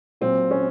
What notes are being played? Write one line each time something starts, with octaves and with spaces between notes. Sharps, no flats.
A#2 F#3 C4
C#4